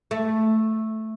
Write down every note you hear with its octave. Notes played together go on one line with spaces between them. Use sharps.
A3